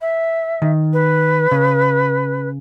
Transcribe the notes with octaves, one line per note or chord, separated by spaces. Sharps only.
E5
D#3
B4
C#3